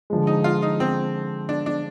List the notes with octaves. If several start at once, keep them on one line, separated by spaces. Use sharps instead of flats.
D3 F3 G#3
D#4
F4
D#4
C4
D4
D4